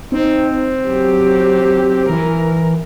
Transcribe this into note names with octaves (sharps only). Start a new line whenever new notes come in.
C4 D#4
F#3 G4
E3 A#4